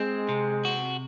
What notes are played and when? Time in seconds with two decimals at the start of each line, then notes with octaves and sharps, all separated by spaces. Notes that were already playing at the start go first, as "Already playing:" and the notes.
Already playing: G#3 C4
0.29 C3
0.65 F#4